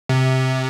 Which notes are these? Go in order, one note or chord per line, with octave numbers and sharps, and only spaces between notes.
C3